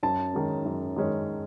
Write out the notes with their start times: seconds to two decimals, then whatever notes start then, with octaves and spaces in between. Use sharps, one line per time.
0.03 F#2 A5
0.33 D#3 G#3 C#4
0.65 F#2
0.96 D#3 G#3 C#4